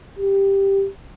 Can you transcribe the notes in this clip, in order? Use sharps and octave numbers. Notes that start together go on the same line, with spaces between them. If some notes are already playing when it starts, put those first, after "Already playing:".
G4